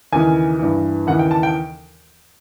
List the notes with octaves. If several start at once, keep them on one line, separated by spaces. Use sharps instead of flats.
D#2 C#3 E3 G#5
G2 E3
D#2 C#3 E3 F#5
G5
A5
G5